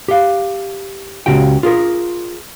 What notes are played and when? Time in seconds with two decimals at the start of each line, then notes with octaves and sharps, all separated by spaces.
0.08 G4 F5
1.26 C#2 C#3 F#4 G4 G5
1.63 F4 G#4 A#4